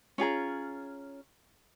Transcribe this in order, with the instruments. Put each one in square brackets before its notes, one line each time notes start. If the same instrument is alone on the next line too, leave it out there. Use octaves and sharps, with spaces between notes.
[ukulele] C#4 F4 G#4 A#5